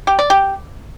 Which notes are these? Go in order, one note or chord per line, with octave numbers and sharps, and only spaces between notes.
G4
D5
G4